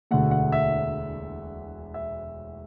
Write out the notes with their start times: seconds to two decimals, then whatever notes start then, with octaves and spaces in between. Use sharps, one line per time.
0.11 E1 D2 D3 A3 F#5
0.31 F#5
0.52 E5
1.94 E5